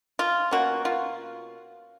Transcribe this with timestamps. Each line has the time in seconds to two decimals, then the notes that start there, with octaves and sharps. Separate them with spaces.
0.19 F4
0.51 B2 A#3 C#4 F#4
0.85 F4